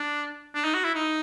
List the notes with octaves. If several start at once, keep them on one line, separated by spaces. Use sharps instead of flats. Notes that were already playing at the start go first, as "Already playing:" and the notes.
Already playing: D4
D4
D#4
F#4
E4
D#4